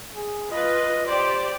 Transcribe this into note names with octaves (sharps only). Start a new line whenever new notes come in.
G#4
F4 B4 D#5
G4 C5 D5